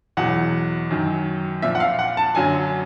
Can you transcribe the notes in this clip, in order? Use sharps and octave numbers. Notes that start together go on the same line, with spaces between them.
E2 B2 F#3 F#5
F#2 D#3 F#3
A#2 F3 E5
F#5
F5
F#5
A5
F#2 D3 F#3 G#5